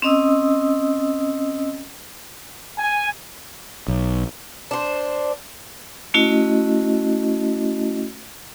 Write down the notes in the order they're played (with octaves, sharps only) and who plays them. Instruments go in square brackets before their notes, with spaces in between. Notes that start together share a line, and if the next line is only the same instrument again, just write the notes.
[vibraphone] C4 C#4 D#5 D#6 E6
[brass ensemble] G#5
[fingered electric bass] B1
[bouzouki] D4 C5
[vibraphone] A3 C#4 E4 F#4 D#5